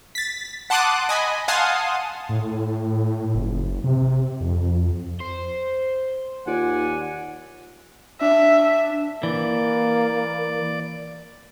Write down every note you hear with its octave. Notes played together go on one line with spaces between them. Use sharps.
A6 B6
F#5 A5 C6 D6 D#6 F#6
D#5 G#5 B5
F5 F#5 G#5 A5 C6 D#6
A2
F#1
C3
F2
C5
D#2 F4 D5 F#5 G#5
D4 E5
E3 A#3 D5